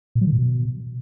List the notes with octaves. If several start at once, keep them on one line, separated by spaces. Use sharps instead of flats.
A#2
F#3
D#3
A#2
B2